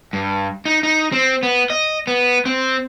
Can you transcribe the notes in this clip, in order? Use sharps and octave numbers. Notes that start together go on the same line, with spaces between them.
G2
D#4
D#4
C4
B3
D#5
B3
C4